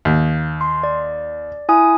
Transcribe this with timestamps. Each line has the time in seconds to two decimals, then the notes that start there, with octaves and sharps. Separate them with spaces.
0.05 D#2
0.61 C6
0.83 D5
1.69 E4 G#5 D#6